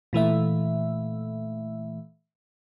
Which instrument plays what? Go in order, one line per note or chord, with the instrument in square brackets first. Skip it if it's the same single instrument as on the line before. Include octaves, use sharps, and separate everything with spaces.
[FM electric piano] A#2 E3 A3 E5